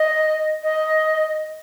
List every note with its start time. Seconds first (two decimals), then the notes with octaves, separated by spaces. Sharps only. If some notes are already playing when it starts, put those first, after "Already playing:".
Already playing: D#5
0.63 D#5